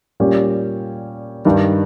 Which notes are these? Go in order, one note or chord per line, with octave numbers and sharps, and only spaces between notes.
A#2 G3 C#4 G4
G2 D#3 G3